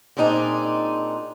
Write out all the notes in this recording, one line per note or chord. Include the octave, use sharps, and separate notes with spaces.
A#2 C4 D4 D#4 G#4